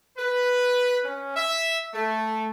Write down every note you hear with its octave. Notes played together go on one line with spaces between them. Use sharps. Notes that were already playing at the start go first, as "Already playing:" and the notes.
B4
C#4
E5
A3